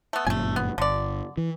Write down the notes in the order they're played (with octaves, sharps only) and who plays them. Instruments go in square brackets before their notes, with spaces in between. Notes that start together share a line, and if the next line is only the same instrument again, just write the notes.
[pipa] A3 B3
[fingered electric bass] G1 F#2 A#2 [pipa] A3 G#5
[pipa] B3
[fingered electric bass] G1 [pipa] D3 D5
[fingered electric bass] E3